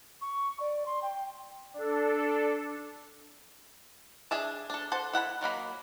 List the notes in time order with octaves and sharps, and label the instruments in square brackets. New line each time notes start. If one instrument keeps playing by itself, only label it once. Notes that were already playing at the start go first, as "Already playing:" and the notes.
[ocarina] C#6
D5
C6
G5
[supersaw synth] D4 A4
[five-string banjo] D4 G#4 E5 A5
D4 A4
A4 C5 F#5
E4 F#5 A#5 B5
D#3 F#3 A#3 B5